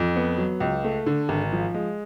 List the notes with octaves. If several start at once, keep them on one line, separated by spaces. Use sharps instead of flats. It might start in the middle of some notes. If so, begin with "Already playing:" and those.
Already playing: F2
B3
F#3
C#2
A3
D3
G#1
F3
G#3